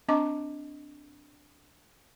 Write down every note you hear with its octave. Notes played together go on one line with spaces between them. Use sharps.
C4 D4 D#5 A#5 C#6 D6